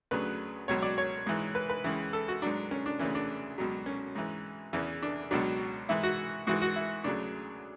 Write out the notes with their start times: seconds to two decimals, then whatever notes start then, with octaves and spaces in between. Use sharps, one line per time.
0.11 D2 C#3 F#3 B4
0.68 C#2 B2 F#3 C#5
0.83 D5
0.98 C#5
1.27 G#2 E3
1.55 B4
1.70 B4
1.84 C#2 C#3 E3
2.13 A4
2.28 F#4
2.42 G#2 F#3 D4
2.71 C#4
2.86 D4
2.99 D2 C#3 E3 C#4
3.15 D4
3.58 C#2 B2 F#3
3.86 C#4
4.15 G#2 E3
4.73 E2 C#3 E3
5.03 D4
5.31 C#2 B2 F#3 D4
5.89 G#2 E3 E4
6.03 F#4
6.47 G#2 E3 F#4
6.62 F#4
6.76 E4
7.04 D2 C#3 F#3 D4